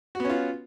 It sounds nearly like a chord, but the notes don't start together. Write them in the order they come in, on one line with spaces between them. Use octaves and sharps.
F#4 B3 C#4 F4